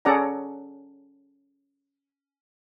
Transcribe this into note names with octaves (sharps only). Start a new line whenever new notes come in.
C#4 G#4 A4 D5 F#5 A#5